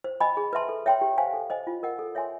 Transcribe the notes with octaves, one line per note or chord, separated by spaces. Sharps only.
C5
D#5 G#5 B5
G#4
B4 E5 A5 C6
A4
C#5 E5 G5 C6
G4
C5 F5 G#5
A4
C5 D#5 G#5
F4
A#4 D#5 F#5
A4
C#5 E5 G#5 C6